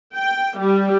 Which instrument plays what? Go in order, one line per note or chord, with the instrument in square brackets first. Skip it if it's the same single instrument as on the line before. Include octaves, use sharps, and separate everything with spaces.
[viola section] G5
G3